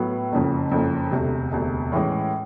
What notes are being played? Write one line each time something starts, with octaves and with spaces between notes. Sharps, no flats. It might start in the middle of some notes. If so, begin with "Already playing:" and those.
Already playing: A2 F#3 B3
F#1 F2 C#3
F#1 F2 C#3
E1 D2 C3
E1 D2 C3
A2 E3 G#3 C#4